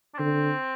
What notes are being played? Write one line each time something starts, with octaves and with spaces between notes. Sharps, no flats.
D4
D3 C4